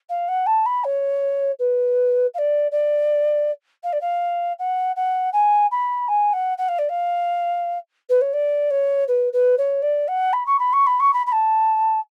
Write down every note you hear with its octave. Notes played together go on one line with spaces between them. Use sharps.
F5
F#5
A5
B5
C#5
B4
F5
D5
D5
F5
D5
F5
F#5
F#5
G#5
B5
G#5
F#5
F#5
F5
D5
F5
B4
C#5
D5
C#5
B4
B4
C#5
D5
F#5
B5
C#6
B5
C#6
B5
C#6
B5
B5
A5